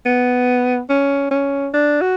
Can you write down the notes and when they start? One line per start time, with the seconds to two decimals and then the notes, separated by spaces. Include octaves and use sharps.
0.06 B3
0.90 C#4
1.31 C#4
1.74 D4
2.01 F#4